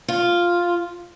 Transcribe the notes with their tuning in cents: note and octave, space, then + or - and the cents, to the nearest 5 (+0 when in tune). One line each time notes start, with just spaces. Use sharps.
F4 +0